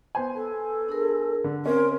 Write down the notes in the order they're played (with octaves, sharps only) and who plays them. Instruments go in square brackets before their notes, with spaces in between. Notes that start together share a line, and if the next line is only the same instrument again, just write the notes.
[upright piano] B3 C5 G#5
[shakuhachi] A4
[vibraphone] D4 G#4 A#4
[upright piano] D3
[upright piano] C4 C#4 [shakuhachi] A#4 [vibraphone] C6